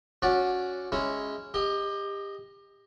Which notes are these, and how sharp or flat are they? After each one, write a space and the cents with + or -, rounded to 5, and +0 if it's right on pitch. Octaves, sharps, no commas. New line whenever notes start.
C#4 +0 F#4 -15 D5 +0
G#3 +0 C#4 +0 E4 -15
G4 +25 D#5 +0